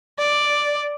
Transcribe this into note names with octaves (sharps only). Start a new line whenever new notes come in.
D5